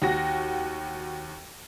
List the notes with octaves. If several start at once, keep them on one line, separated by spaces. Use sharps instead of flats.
D#2 F#4 A#6